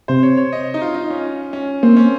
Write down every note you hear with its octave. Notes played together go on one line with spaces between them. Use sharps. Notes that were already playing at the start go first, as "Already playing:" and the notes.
C3 C5
C#5
C#5
D#5
D#4
F4
D#4
C#4
C#4
A#3 C4
C#4